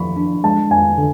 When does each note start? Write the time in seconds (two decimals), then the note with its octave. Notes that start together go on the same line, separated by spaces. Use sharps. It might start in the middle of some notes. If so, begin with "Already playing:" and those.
Already playing: F2 F3 B5 C#6
0.16 D4
0.44 G#3 A5
0.71 F2 G#5
0.98 D3